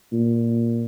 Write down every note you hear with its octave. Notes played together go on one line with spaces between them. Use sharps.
A#2